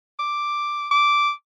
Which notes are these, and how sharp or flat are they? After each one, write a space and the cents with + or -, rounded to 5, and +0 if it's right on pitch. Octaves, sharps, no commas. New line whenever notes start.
D6 +5
D6 -5